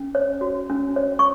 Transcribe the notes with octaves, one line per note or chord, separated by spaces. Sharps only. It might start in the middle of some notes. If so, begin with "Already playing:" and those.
Already playing: C#4
C#5
F#4
C#4
C#5
C#6